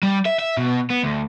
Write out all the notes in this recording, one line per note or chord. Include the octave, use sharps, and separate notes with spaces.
G3
E5
E5
B2
B3
D2